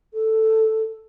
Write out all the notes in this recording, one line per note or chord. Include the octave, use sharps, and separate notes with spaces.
A4